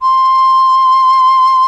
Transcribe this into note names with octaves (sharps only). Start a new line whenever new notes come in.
C6